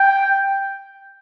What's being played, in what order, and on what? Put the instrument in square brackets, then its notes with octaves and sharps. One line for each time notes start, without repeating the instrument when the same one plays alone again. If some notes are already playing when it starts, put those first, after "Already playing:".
Already playing: [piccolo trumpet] G5